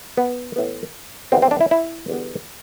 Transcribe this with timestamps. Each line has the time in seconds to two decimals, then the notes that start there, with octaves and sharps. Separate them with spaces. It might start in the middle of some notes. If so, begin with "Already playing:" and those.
0.17 B3
0.56 A2 E3 B3
1.32 E2 D3 G3 B3 C4
1.42 C4
1.51 D4
1.61 E4
1.71 E4
2.08 E2 D3 G3 B3